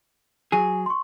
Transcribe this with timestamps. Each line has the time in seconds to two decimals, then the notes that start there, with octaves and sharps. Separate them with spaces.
0.52 F#3 G#4 G#5
0.86 C6 C#6